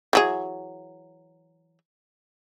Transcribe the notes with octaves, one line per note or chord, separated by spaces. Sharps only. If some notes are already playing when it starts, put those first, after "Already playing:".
E3 F#3 G#4